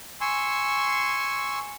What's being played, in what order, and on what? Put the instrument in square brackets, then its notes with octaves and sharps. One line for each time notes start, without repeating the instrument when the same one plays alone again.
[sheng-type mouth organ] G#5 C6 C#6 E6